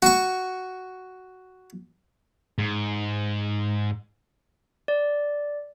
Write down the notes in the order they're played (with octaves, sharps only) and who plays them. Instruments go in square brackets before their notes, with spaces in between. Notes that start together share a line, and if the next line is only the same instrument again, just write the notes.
[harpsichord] F#4 C#6
[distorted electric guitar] G#2
[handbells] D5